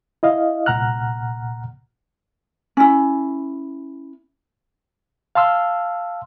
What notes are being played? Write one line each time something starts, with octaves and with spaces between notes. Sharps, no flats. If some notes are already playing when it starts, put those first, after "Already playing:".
E4 D#5 F5
C2 A#2 F#5 A#5 F6 F#6
C#4 E4
F5 A5 C6 E6 F6